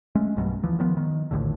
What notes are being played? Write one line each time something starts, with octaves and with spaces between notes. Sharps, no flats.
G#3 A3 C#4
B1 G2 B2 F#3
D#2 E3 F3
D#3 F3 B3
D#3
A#1 D#2 A2 D3